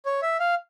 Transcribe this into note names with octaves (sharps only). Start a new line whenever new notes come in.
C#5
E5
F5